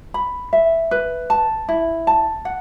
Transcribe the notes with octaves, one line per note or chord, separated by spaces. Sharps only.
B5
E5
B4
A5
E4
A5
F#5